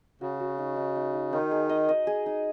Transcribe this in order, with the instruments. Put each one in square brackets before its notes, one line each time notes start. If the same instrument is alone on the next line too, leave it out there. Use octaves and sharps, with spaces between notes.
[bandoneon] C#3 [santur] F#4
[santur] F#4
D#4
D#4
D#4
D#4
[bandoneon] D#3 [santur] D#4
[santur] G#4
D#5
D#5
G#4
D#4